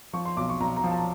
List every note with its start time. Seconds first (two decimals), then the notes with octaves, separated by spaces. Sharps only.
0.13 F3 C#6
0.25 C6
0.37 B1 D6
0.49 C#6
0.61 B1 A#5
0.77 A#5
0.84 F3
0.91 A5